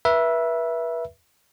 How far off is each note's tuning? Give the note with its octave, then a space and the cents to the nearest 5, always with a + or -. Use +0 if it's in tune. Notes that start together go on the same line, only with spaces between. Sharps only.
B4 -30 E5 +5